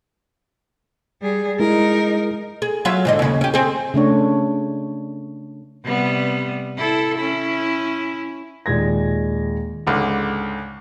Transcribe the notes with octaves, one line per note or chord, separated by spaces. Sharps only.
G3 G#4
G#3 D#4 E4 G#4 A#4
G#4
F#3 F4 E5
G#2 D3 D#5
D#2 C#3
C#4 G4
C4 G#4
C#3 A3 D4 C#5
C3 G3 B3
E4 A4
C#4 E4
D#2 A#2 G#3 G#6 A#6
C#2 G#2 D3